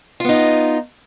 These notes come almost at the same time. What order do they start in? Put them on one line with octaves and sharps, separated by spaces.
F4 B3 D#4